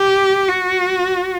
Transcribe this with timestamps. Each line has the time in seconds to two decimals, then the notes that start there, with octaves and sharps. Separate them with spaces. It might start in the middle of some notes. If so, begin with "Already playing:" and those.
Already playing: G4
0.49 F#4